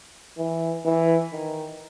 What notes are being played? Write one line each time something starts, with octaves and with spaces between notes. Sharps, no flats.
E3
E3
D#3